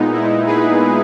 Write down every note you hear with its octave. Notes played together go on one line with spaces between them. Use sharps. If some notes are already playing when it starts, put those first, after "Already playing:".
Already playing: A#2 G#3 B3 D#4
E4
G#4 B4